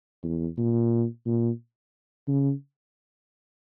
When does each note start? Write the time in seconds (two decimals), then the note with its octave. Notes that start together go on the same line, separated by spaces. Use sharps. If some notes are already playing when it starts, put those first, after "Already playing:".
0.24 E2
0.58 A#2
1.26 A#2
2.28 C#3